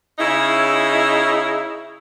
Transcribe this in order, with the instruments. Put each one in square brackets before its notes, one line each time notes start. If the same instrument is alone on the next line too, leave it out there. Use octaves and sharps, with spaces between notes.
[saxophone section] C#3 D#4 E4